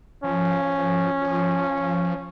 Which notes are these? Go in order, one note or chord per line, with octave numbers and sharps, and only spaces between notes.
F3 C#4
F3